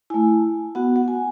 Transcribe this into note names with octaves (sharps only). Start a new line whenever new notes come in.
A3 E4 G#5
B3 F#4 F#5
F#5
G#5